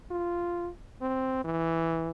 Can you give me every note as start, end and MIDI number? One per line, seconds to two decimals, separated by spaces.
0.11 0.69 65
1.02 1.44 60
1.45 2.10 52